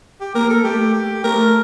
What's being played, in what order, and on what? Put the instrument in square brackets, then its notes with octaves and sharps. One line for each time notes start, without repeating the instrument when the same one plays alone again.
[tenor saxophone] G4
[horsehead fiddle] A#3 [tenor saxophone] A#4
[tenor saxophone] A4
[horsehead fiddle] A3 [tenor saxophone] G4
[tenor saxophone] G4
[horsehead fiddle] A3 [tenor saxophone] A#4